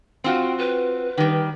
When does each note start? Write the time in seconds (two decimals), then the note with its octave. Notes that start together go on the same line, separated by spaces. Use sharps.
0.24 C4 F4 F#4 G5
0.58 B4
1.17 D#3 G3